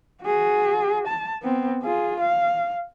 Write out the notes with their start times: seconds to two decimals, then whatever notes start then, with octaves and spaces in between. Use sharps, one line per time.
0.23 F#4 G#4
1.07 A5
1.43 B3 C4
1.82 F4 G#4
2.20 F5